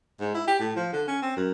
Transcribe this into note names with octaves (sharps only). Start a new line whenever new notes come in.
G#2
E4
G4
A2
F3
D3
C#4
C4
F#2